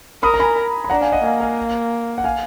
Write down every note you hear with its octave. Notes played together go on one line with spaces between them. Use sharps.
A#4 B5 D#6
A#5
G#5 B5
B5
D4 F#5 A#5
F5 G#5
D#5 F#5
A#3 F5 G#5
F5 G#5
F#5
F5 G#5